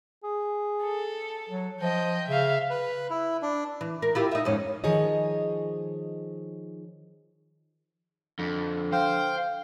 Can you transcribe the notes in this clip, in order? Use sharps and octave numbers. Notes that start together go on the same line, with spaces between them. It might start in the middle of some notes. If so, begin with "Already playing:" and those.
G#4
A4
F#3
F3 D#5 G5
C#3 E5 F5
B4
E4
D4
E3
A#4
E4 F4 G4
D#4 E5
F2 G#2 C#4
D#3 F3 G#4 C#5 D#5
F2 D3
C5 F5 G5